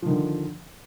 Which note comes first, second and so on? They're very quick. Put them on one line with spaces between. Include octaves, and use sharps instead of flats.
F3 D#3 D3